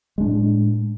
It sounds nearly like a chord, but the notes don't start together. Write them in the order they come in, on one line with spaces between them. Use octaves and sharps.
G#3 D4 A2